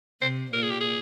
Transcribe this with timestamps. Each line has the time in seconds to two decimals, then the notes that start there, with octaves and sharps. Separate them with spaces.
0.22 C3 C5
0.53 A#2 A#4
0.63 G#4
0.70 G4
0.81 G#4